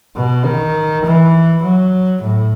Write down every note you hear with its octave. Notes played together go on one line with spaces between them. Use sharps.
B2
D#3
E3
F#3
A2